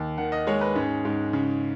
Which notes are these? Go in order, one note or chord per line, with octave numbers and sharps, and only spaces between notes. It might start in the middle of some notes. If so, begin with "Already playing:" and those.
Already playing: D#2
D#3 F#5
D#5
G#3 C#5
B4
G#2 C#4
G#2
C#3